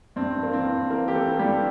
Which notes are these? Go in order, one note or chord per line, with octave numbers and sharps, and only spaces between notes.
G2 C4
G2
A#3
E3 C4
G2
E3 A#3 A#4
E3 G4
A3 A4
E3
G3 G4
G2